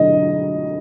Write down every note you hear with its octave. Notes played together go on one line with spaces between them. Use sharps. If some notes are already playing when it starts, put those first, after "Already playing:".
Already playing: D3 F#3 D#5